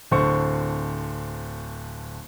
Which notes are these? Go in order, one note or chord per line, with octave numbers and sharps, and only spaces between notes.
D1 D3 C5 C#6